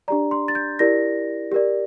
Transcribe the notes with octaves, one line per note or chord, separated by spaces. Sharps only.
D4 G4 D5 A#5
C6
A6
G6
E4 G4 A#4 D5 A#6
G4 A#4 D5